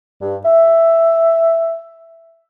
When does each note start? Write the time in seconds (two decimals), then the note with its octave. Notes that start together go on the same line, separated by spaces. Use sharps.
0.21 G2
0.45 E5